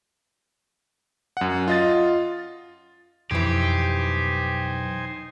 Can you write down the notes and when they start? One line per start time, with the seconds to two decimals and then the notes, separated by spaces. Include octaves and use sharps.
1.37 F#2 F#5
1.68 F4 D#5 A6
3.31 B1 F2 E3 D#4 G4 C5 G#5